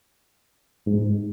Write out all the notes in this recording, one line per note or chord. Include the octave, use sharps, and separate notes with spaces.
G#2